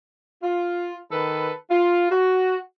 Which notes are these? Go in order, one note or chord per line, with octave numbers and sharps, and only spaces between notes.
F4
D#3 A4 B4
F4
F#4